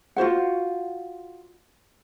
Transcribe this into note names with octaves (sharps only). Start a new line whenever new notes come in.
F4 F#4 C5 F#5